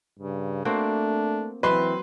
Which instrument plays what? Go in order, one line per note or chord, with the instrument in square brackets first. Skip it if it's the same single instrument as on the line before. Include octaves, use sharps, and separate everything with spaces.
[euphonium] G2 [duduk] C#3
[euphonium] A3 [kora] A#3 C4 F#4 [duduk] D4
[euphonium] E3 [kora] F#3 [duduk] C4 [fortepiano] B4 C6